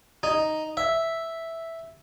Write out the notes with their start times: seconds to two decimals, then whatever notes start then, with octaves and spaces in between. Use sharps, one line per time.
0.23 D#4
0.77 E5